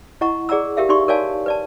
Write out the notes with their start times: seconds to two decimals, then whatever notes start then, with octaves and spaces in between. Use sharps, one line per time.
0.21 E4 D#5 F#5 A#5 C#6
0.49 G#4 D5 F#5 A#5 E6
0.77 G4 A#4 E5 F5
0.89 D#4 G4 D5 C6 C#6
1.08 A#4 C#5 D5 F5 G#5 A5
1.46 B4 D5 A5